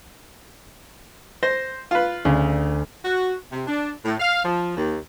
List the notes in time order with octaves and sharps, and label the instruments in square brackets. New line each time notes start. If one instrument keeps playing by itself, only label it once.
[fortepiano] C5 [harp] A#6
[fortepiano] F4 B4
[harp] D2 [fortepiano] C#3
[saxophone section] F#4
C3
D4
A2
F5
F3
D#2